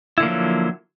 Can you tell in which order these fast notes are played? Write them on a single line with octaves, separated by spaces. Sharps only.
E4 D3 A#3 F3 F#3